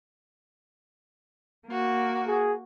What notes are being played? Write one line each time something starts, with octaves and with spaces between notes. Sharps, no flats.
A#3 F#4
G#4